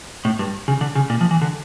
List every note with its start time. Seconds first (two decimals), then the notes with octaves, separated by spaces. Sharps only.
0.25 A2
0.39 G2
0.68 C#3
0.81 D3
0.95 C#3
1.10 A#2
1.21 F3
1.31 E3
1.42 D3